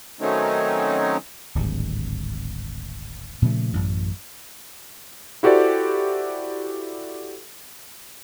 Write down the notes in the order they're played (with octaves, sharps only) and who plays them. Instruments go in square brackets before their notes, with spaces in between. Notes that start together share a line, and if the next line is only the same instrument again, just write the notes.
[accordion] D#3 F#3 A3 C4 C#4 D#4
[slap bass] D1 G#1 G2
A#2 C#3 F3 A3
A1 F#2
[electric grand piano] E4 F#4 G4 A4 C5 D5